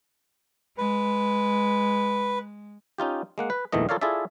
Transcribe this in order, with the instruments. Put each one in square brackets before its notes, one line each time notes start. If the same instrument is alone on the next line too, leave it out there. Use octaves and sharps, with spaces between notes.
[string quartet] G#3 [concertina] B4
[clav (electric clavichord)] C#4 D#4 F4 G4
G#3 A#3 F#5
B4
A#1 E2 D#3 E3 A3 D#5
F4 A4 A#4 C#5 D5 F5
E4 F4 G#4 A4 D5 E5